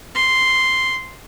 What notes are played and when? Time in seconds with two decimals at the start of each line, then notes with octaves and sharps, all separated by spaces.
0.16 C6